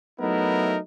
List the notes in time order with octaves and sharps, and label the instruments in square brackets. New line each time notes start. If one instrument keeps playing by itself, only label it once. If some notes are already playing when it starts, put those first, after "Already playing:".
[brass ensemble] F#3 A3 B3 D#4 E4 A#4